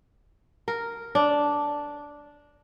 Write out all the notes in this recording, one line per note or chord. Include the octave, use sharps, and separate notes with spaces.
A#4
D4